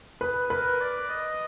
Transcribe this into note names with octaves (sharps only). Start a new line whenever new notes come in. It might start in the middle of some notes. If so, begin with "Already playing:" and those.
G#4 B4
A#4 B4
D5
D#5